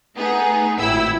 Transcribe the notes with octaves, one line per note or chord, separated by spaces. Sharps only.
A3 B3 D#4 G#4
G#1 A2 E4 G5 B5 E6